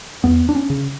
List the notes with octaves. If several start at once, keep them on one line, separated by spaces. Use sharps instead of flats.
E2 B3
D4
C#4
C#3